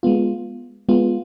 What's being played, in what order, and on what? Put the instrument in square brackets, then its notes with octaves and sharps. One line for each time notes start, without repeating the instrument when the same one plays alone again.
[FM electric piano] G#3 B3 F4
G#3 B3 F4